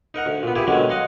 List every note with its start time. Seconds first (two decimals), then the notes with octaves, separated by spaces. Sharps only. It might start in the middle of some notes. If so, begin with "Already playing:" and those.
0.14 D#4 A#4 F#5 A#5
0.26 D2
0.43 A#2 B3
0.56 A#2 E4 G4 G#4
0.67 B2 D3 D#3 F#3 G#3
0.89 D#5 F5 F#5 A#5 C6